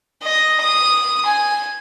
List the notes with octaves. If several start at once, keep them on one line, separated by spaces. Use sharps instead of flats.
D#5
D#6
G#5